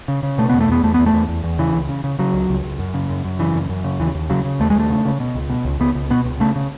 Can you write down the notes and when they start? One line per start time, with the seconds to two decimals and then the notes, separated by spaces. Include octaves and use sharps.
0.08 C#3
0.23 C#3
0.38 B2 A3
0.49 E2 B3
0.61 A3
0.69 E2 B3
0.83 E2 A3
0.94 E2 B3
1.06 A3
1.13 E2
1.28 E2
1.44 E2
1.59 C#3 E3
1.74 C#2
1.89 C#3
2.04 C#3
2.19 C#3 F#3
2.34 C#2
2.49 C#2
2.64 C#2
2.79 F#2
2.94 C#3
3.09 F#2
3.25 F#2
3.39 C#3 E3
3.55 F#2
3.69 F#2
3.84 C#3
4.00 D#2 E3
4.15 D#2
4.30 C#3 F#3
4.45 C#3
4.60 D#2 A3
4.70 G#3
4.75 D#2 A3
4.90 C#3
5.05 C#3
5.20 B2
5.35 C#2
5.50 B2
5.65 C#2
5.80 C#2 B3
5.95 C#2
6.10 B2 B3
6.25 C#2
6.40 C#3 A3
6.56 C#3